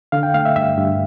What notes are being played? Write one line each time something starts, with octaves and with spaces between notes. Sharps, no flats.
D3 F5
G5
A3 F5
E5
G2 E5
G2